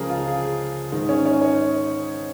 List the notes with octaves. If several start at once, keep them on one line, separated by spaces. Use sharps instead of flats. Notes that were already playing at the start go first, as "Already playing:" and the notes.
Already playing: C#2 C#3 F3 G#3 G#4 A#4
F4
G#4
G#2 D#3 G#3 D#4
C#4
C#4
C#5